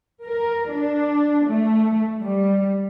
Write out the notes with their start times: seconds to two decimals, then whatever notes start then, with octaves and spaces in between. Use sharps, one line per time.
0.23 A#4
0.71 D4
1.46 A3
2.22 G3